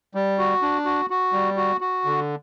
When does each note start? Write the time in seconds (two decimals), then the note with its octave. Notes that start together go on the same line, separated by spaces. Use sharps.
0.15 G3
0.38 F#4
0.62 D4
0.85 F#4
1.10 F#4
1.33 G3
1.57 F#4
1.81 F#4
2.05 D3